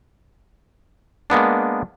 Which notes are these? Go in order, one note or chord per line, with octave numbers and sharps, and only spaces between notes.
G#3 A#3 B3 D4